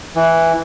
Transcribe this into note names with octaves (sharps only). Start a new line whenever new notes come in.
E3